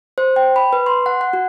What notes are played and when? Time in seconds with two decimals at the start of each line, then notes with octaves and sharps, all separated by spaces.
0.18 C5
0.36 G5
0.56 B5
0.73 B4
0.86 C6
1.06 F#5
1.21 F#5
1.33 F#4